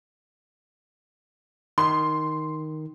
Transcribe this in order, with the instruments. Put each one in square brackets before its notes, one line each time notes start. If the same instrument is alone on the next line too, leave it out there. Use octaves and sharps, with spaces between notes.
[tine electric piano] D#3 [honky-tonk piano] C6